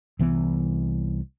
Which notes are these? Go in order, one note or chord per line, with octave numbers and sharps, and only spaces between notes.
C2 E3 B3